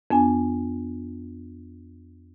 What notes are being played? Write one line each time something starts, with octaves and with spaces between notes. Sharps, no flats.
F2 B3 D4 G#5